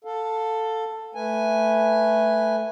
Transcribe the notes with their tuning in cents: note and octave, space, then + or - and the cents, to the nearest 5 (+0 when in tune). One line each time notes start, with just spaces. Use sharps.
A4 +10 F5 +25
A3 +0 B4 -5 G#5 -5